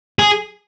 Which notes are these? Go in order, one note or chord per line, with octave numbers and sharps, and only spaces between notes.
G#4